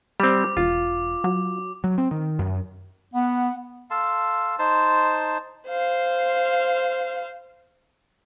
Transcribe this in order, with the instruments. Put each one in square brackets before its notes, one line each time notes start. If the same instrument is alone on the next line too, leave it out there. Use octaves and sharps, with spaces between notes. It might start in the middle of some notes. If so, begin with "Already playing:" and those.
[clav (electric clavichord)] G3 C4 [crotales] D6
[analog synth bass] E1 [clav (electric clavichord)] F4
[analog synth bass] F#3
[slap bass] F#3
C4
D#3
F#2
[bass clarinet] B3 [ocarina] F#5
[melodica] A4 F5 A5 C6
D#4 C5 A5 C6
[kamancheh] C5 F5